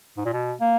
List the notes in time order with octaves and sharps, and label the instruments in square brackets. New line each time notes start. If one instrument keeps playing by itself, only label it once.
[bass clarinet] G#2
A#2
B2
A#3